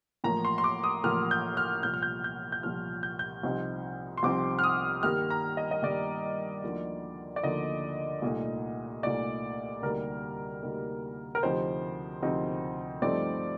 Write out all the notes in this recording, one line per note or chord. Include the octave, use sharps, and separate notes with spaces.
A1 A2 F3 A#3 A#5
C6
C6
D6
D#6
A1 A2 F3 A#3 F6
G6
F6
C2 A#2 F3 G6
F6
G6
G6
G6
C2 A#2 F3 F6
G6
G6
C2 C3 F3 C4 D#4
C6
C2 C3 F3 C4 D#4 D6
F6
D#6
G2 D#3 G3 A#3 F6
A#5
D#5
D#5
G2 D#3 G3 A#3 D5
D2 D3 F3 A#3 D#4
D5
D2 D3 F3 A#3 D#4 D#5
C2 A#2 A3 D#4
C2 A#2 A3 D#4 D5
D2 C3 G3 A#3 D#4 A#4
D2 C3 G3 A#3 D#4
A#4
D2 C3 F3 C4 D#4 C5
D2 C3 F3 C4 D#4
G2 F3 A3 C4 D#4 D5